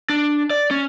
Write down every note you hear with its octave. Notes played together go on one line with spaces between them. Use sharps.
D4
D5
C#4